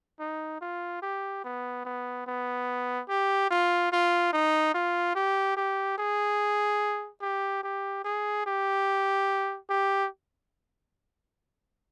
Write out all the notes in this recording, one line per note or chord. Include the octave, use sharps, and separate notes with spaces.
D#4
F4
G4
B3
B3
B3
G4
F4
F4
D#4
F4
G4
G4
G#4
G4
G4
G#4
G4
G4